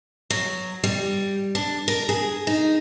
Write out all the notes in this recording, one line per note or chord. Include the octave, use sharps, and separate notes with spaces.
F#3
G3
D4
A#4
G#4
D#4